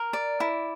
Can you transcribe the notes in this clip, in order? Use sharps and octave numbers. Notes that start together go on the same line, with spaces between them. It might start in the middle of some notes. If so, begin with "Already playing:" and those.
Already playing: A#4
D5
E4